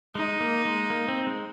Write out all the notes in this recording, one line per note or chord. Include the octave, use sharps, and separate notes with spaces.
G#3 D#4
A#3
G#3
A#3
C4
G#3